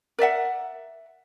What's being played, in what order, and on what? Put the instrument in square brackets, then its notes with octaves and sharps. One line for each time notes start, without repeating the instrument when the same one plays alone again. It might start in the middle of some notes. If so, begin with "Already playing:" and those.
[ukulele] A#4 D5 E5 F#5